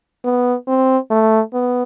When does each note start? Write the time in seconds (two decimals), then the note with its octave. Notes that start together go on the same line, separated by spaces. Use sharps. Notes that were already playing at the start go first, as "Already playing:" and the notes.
0.25 B3
0.68 C4
1.11 A3
1.54 B3